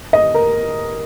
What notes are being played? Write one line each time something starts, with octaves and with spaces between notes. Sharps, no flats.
D#5
A#4